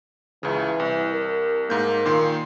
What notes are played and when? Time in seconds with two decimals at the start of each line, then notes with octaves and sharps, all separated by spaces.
0.43 C#2 C#3 E3
0.80 C2
1.12 A#4
1.70 G#2 A#3 G6
2.05 A#2 D#3 C6